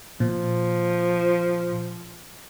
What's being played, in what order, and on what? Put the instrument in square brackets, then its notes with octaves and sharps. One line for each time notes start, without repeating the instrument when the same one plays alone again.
[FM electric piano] A#2 [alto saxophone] F3